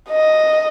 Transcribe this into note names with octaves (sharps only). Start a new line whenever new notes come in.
D#5